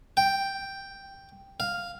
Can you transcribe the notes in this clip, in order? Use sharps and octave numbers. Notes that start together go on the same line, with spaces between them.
G5
F5